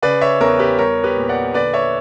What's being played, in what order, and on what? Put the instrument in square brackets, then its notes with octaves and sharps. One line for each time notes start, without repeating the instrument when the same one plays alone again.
[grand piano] C#3 B4 D5
C#5 E5
E2 A#4 C#5
G4 B4
G3 A#4 C#5
G4 B4
A#2
D5 F#5
D3 B4 D5
C#5 E5